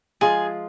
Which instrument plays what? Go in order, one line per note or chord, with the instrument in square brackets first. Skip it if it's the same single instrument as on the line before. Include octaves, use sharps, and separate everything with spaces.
[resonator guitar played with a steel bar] F3 G#3 F4 [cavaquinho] G#4